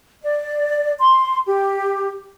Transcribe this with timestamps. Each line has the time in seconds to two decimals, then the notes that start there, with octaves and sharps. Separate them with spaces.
0.22 D5
1.00 C6
1.47 G4